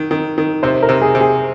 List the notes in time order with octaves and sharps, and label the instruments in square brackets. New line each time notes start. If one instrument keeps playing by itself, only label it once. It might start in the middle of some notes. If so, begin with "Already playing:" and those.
Already playing: [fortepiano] D#3
D#3
D#3
[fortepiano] C3 [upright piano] C5
[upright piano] A#4
[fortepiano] C3
[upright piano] G#4
[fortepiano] C3
[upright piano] G#4